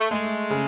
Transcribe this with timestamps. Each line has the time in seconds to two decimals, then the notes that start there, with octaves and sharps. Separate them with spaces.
0.01 A3
0.11 G#3 A3
0.50 C#3